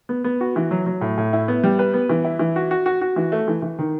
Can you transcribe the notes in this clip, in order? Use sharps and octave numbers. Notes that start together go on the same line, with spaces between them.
B3
B3
F#4
E3
F#3
F#3
A2
A2
E4
B3
G3
B4
B3
E3
E4
E3
F#4
F#4
F#4
F#4
E3
A3
E3
E3
D#3